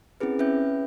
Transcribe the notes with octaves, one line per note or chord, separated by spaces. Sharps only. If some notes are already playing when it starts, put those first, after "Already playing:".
C4 C#4 E4 G#4 B4
C#4 B4 E5 G6